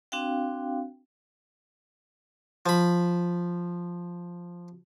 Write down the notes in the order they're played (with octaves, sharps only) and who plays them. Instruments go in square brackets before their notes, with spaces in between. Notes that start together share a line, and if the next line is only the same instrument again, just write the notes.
[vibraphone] C4 D4 F#4 F5 G5
[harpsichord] F3 B5